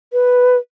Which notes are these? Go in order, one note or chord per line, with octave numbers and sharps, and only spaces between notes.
B4